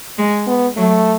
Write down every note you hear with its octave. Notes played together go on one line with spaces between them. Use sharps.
G#3
B3
F#3 A3